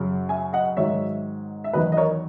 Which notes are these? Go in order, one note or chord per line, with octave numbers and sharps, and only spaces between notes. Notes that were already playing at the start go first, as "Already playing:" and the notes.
Already playing: F#2 C#3 F#3
E5 G#5
D#5 F#5
G#2 D#3 F#3 C#5 E5
E5
E2 D#3 F#3 B4 D#5
D#5
A#4 C#5